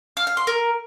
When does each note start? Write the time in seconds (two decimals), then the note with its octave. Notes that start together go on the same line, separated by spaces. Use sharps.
0.17 F5
0.27 F5
0.37 C6
0.47 A#4